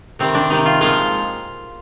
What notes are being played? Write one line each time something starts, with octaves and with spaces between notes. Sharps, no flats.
C3 D#3 G3 C4
D4
C3 D#3 G3 D#4
F4
A#2 F3 G#3 F4